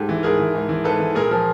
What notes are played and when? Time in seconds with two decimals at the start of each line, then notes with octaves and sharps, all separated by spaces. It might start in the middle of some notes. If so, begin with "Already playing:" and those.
Already playing: G#2 G4 A4
0.09 E3
0.23 G#2 G#4 A#4
0.40 E3
0.55 G#2
0.69 E3
0.84 G#2 A4 B4
1.00 E3
1.15 A#2 G#4 A#4
1.31 F3